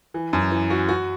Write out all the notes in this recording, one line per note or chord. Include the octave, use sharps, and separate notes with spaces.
E3
F#2
E3
F#4
F#4